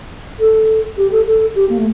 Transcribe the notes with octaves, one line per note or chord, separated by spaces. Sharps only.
A4
G4
A4
A4
G4
A#3
A3